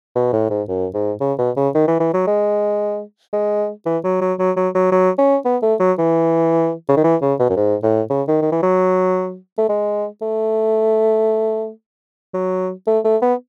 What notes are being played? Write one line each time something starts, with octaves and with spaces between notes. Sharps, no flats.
B2
A2
G#2
F#2
G#2
C#3
B2
C#3
D#3
E3
E3
F#3
G#3
G#3
E3
F#3
F#3
F#3
F#3
F#3
F#3
C#4
B3
A3
F#3
E3
C#3
D#3
E3
C#3
B2
F#2
G#2
A2
C#3
D#3
D#3
E3
F#3
A3
G#3
A3
F#3
A3
A3
B3